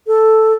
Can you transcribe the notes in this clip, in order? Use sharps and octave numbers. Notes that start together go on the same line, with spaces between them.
A4